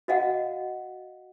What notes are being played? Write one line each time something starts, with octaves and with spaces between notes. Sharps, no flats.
F#4 D#5 F5 F#5